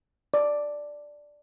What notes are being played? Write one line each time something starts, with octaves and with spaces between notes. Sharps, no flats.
D5